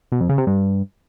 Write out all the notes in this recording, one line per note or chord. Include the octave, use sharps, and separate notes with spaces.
B2
F2
C#3
C3
G2